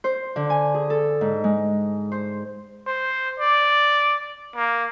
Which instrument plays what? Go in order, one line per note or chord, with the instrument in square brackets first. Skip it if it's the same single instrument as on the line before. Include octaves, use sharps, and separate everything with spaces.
[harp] C5
D3
G#5
G#4
A4
G#2
G#3
C5
[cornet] C5
D5
A#3